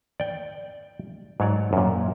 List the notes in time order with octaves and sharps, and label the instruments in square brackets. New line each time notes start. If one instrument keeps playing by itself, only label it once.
[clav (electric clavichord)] D5 G5
G#2 F#3 C#5 D5
F#2 A#2